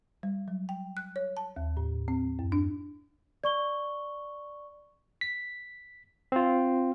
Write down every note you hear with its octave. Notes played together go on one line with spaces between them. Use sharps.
G3
F#3
G5
F#6
C#5
A5
D#2
A2
C4
F#2
D4
D5 C#6 G7
B6
C4 F4